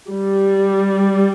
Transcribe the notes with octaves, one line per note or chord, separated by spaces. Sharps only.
G3